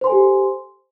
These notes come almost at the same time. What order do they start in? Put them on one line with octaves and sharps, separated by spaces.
C5 C6 G#5 A4 G4